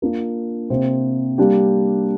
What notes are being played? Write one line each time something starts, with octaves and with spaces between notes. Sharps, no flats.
A#3 D4 F4 A#4
C3 A#3 G4 C5
G3 A#3 D4 G4